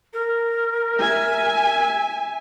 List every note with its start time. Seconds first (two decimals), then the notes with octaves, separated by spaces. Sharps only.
0.13 A#4
0.97 E5 G#5